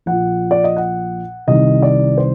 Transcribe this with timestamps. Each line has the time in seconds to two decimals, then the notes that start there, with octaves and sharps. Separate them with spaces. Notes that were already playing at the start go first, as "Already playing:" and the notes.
0.06 A#1 A#2 F#5
0.51 D5
0.64 D#5
0.76 F#5
1.47 C2 C3 D#3 D#5
1.82 D5
2.18 C5